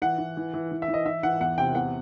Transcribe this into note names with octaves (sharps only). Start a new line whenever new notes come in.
E3 F#5
E3
E3
E3
E3
E5
E3
D#5
E3 E5
E3 F#5
E2 F#5
C3 G5
E2 F#5